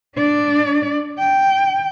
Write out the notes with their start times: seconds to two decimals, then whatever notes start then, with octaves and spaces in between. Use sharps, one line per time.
0.15 D4 D5
1.19 G5